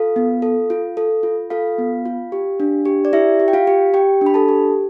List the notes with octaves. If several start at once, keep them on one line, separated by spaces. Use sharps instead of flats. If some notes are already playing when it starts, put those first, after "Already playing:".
Already playing: F4 A4 F5
B3
A4
F4
A4
F4
F4 A4 F5
B3
F4
G4
D4
G4
D5
E4 G4 E5
G4
G5
F4 F5
G4
G4 G5
D4
B5
A4 A5
G4